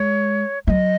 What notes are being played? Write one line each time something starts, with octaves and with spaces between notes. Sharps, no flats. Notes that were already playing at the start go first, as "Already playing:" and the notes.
Already playing: G#3 C#5
F#3 D#5 E5